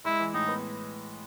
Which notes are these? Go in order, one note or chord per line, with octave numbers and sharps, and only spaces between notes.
G#3 E4
E3
A2 D#4
B3